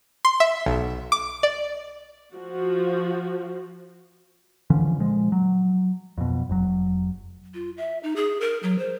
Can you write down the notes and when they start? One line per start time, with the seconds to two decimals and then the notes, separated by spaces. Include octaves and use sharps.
0.25 C6
0.40 E5
0.66 B1
1.12 D6
1.43 D5
2.35 F3 F#4
4.70 D3 E3 F3 C#4
5.00 A#2 F3 G#3
5.32 F#3
6.18 F2 B2
6.49 F1 F#3
7.54 F4
7.78 E5
8.03 D#4
8.16 G#4
8.41 A#4
8.63 F#3
8.79 C5